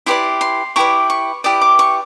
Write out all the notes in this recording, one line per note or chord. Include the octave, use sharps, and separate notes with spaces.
E4 G4 B4 D5 C6
C6
E4 G4 B4 D5 C#6
C#6
E4 G4 B4 D5 D#6
D6
C#6